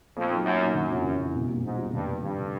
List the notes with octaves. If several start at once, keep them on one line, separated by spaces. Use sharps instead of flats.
F2 A#2
F#3 A#3 D#4
F#2 A#2
F#3 A#3 D#4
F#1 F#2
F2 C3 E3
F#1
F2 C3 E3
B1
A#2 G3 A#3
B1 G#2
A#2 G3 A#3
F1 G2
F2 D3
F1 G2
D3